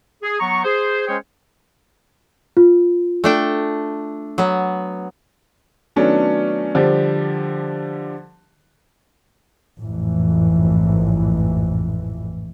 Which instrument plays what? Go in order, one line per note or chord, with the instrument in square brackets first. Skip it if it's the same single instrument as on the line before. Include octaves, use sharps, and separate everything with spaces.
[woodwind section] G#4
F#3 B3 A#5 C#6
G#4 C5
G#3 C#4 G#4 C5 C#5 G5
[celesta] F4
[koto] A3 D4 G5
F#3 B3
[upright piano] D#3 F#3 A3 B3 C#4 D4
D3 F3 G3 G4
[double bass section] A1 F2 G#2 E3